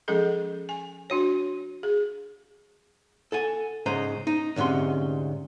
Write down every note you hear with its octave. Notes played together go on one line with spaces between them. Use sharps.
F3 G#3 C#4 G#4 A4 D#5
G#5
D4 F#4 C#5
G#4
A4 F#5 G#5
G#2 C#3 C5 D#5 A#5
D#4
D2 G#2 C3 C#4 C6